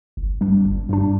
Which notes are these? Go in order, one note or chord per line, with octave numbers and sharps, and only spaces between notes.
G1
G2 G3 D4
G1
G2 G3 D4